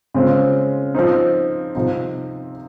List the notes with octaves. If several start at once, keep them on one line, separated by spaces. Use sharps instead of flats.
C#3 G#3 C4 F4
F3 C4 D#4
C3 F3 C4 D#4